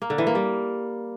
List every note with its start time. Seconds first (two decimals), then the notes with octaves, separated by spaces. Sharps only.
0.02 A#3
0.10 D3
0.18 E3
0.27 A#3
0.35 G3